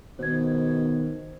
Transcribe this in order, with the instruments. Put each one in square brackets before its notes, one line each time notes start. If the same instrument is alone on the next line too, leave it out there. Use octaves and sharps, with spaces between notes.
[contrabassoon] B2 [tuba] D#3 [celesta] C5 G#6